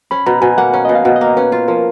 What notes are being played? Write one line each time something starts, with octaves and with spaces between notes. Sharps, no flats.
C#4 B5
B2 A#5
B2 G#5
A#3 F#5
C#4
B2 D#5
F5
B2
D#5
A#3
C#4 B4
F4
F3 A#4